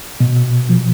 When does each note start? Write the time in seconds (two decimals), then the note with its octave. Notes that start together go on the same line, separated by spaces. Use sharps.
0.20 B2
0.69 F3